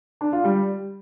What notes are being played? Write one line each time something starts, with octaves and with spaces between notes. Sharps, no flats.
D4
F4
G3